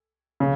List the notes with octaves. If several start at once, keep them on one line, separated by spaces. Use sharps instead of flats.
C#3